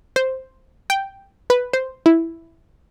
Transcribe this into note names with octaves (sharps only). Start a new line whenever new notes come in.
C5
G5
B4
C5
E4